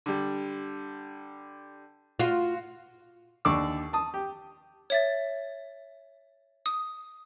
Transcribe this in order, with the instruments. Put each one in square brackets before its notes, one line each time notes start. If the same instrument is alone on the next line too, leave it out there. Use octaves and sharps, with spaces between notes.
[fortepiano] D3 G3
[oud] F4 [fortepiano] F#4
[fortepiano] D#2 D3 D5 C#6 D6 E6
A5 D#6
G4
[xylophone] C#5 E5 A6
D#6